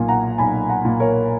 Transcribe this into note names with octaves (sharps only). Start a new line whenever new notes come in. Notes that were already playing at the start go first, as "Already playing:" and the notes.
Already playing: B1 A#2 G#5
F#5 A#5
B1 G#5 B5
F#5 A#5
A#2
A#4 C#5